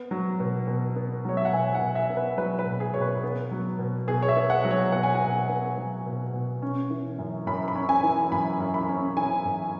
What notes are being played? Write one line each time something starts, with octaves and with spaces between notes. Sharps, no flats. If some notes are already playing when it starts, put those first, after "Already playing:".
Already playing: B3
F#3
B2
B2
B3
F#3 C#5
E5
F#5
B2 G#5
F#5
B2
E5
B3
B4
F#3 B4
B4
B2
G#4
B2 C#5
B4
B3
F#3
B2
B2 G#4
C#5
E5
B3
F#5
F#3
C#5
B2 F#5
G#5
F#5
B2
B3
F#3
B2
B2
C#4
E3
F#2
F#2 B5
B5
C#4
G#5
E3
F#2 B5
F#2
B5
C#4
E3 G#5
F#2